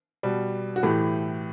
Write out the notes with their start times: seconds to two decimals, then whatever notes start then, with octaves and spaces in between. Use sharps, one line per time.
0.23 B2 G3
0.76 F#4
0.83 A2 E3 A3 G4